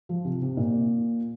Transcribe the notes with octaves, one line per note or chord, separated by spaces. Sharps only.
F3
C3
C3
A#2